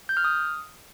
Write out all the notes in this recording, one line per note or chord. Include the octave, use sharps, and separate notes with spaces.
G6
F6
D#6